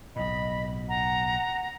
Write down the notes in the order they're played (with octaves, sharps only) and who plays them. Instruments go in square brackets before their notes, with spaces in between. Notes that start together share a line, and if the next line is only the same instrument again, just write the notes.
[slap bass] B1 A2 [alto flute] D#5 [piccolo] B5
[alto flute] F#5 [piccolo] A#5